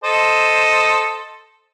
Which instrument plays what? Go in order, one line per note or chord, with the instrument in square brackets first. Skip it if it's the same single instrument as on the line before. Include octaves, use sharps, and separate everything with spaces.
[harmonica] A4 C5 D#5